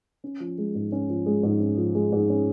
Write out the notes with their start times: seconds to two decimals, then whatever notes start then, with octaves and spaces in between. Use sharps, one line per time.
0.24 C#4
0.40 F3
0.58 G#3
0.75 G#2
0.92 C#4
1.10 F3
1.26 G#3
1.43 G#2
1.60 C#4
1.77 F3
1.95 G#3
2.12 G#2
2.30 C#4